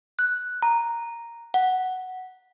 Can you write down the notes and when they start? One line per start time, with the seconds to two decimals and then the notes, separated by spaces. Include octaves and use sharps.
0.19 F#6
0.63 A#5
1.54 F#5